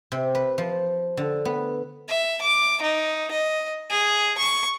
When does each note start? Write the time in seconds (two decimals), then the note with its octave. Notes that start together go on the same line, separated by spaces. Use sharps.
0.12 C3
0.35 B4
0.58 F3
1.17 D3
1.45 B3
2.09 E5
2.42 D6
2.82 D#4
3.31 D#5
3.91 G#4
4.38 C#6